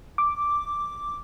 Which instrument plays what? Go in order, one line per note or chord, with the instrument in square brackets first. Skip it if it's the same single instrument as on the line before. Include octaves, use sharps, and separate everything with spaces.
[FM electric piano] D6